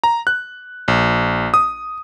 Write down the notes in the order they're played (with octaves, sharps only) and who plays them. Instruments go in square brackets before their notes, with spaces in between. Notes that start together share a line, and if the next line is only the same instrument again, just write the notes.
[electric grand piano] A#5
F#6
A#1
D#6